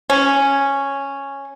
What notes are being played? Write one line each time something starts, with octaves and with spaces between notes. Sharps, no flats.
C#4